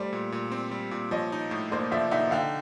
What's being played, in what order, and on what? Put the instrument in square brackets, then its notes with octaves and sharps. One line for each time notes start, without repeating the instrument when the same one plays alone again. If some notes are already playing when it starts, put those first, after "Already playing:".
Already playing: [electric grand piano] G3 A3 [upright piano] C5 D5
[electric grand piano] A#2
A#2
C4
G3
A#2
[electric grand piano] F3 [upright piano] C#5 D#5
[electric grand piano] D#4
A2
[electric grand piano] A#3 [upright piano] C5 D5
[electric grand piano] F3 [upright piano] D5 E5
[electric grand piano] D#4 [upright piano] E5 F#5
[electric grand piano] D3 [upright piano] F5 G5